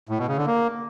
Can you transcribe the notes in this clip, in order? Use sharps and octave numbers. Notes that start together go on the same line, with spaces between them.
A2
B2
C#3
D3
A#3